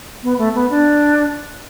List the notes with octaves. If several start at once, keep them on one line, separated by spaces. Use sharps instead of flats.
B3
A3
B3
D4